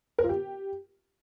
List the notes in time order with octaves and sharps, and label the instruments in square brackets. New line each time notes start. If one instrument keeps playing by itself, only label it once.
[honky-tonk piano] A#4
F4
G4